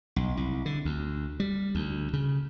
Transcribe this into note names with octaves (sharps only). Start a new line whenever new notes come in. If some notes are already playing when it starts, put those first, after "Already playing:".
B1
C2
D3
D2
G3
D2
C#3